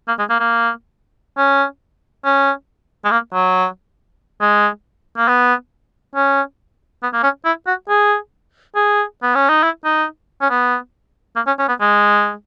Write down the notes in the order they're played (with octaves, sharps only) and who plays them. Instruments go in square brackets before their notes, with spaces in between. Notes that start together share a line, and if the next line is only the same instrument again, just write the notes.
[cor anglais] A#3
G#3
A#3
A#3
C#4
C#4
G#3
A#3
F#3
G#3
A#3
B3
C#4
B3
A#3
C#4
E4
F#4
G#4
G#4
B3
C#4
D#4
E4
D#4
C#4
B3
A#3
C#4
C#4
B3
G#3